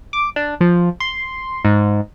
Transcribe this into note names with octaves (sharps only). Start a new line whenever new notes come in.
D6
D4
F3
C6
G#2